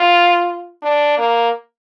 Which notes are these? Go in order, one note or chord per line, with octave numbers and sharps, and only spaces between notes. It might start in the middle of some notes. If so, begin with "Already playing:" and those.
Already playing: F4
D4
A#3